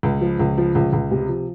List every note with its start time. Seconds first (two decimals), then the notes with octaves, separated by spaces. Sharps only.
0.03 C#2
0.21 F3
0.39 C#2
0.58 F3
0.75 C#2
0.93 C#2
1.11 C3
1.29 F3